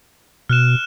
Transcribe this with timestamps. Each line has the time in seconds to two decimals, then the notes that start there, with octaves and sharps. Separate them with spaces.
0.49 B2 F6 F#6 E7